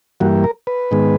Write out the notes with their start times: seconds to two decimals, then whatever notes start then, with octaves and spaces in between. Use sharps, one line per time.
0.20 G2 E3 G3 A#3 F#4
0.44 A#4
0.67 B4
0.91 G#2 D#3 G#3 B3